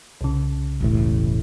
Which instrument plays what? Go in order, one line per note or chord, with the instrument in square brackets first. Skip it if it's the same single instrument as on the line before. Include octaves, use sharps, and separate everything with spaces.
[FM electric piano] C2 C#3
[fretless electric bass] E1 A1 A2